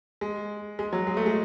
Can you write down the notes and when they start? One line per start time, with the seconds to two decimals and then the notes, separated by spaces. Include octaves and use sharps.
0.21 G#3
0.79 G#3
0.93 F#3
1.07 G#3
1.17 A3
1.26 G#3